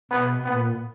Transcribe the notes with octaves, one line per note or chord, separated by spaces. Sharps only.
B2 B3
A#2 B3